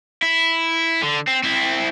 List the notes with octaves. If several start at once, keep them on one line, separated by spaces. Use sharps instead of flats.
E4
D3
C4
C4 E4